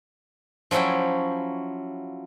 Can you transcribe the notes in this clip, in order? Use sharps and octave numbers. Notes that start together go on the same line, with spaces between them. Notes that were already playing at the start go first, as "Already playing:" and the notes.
F3 F#3 C#4 E4 G5